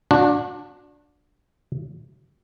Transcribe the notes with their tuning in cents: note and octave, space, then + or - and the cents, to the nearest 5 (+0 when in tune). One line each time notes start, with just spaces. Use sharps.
D4 +0 F#4 -35